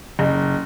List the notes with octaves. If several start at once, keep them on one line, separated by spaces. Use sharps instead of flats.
F#1